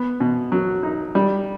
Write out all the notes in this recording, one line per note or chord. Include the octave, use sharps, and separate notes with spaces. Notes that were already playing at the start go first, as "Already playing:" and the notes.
Already playing: B3
B2
F#3
D#4
G3